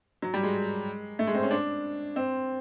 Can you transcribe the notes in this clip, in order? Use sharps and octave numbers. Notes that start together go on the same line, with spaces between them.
F#3
G3
G#3
A3
G#3
C4
C#4
D4
C4